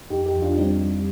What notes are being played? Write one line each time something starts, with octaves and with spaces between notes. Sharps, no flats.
F2 D#4 G4
D#4 G4
F2
D4 F4
G3 C4 D#4
G3